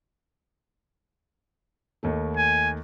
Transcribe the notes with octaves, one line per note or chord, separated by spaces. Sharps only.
D#2 D#3 A3
G#5